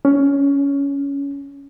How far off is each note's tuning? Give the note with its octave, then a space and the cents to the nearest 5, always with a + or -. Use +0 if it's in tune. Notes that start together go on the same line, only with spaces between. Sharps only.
C#4 +15